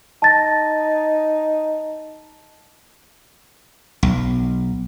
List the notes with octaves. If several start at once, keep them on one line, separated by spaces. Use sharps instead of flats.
D#4 A5 A6 A#6
B1